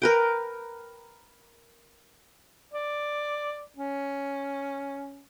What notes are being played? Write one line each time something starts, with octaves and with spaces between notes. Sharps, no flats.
A#4 B4 G5
D5
C#4